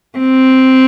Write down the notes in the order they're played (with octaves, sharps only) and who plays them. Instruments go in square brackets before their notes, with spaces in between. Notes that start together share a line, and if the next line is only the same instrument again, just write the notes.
[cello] C4